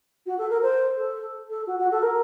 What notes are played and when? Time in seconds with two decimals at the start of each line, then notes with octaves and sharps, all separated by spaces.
0.26 F#4
0.38 A4
0.49 A#4
0.62 C5
0.97 A4
1.49 A4
1.66 F#4
1.78 F#4
1.91 A4
2.02 A#4